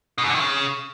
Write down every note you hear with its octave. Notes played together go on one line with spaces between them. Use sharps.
B2
F#2
D3
D#3
C#3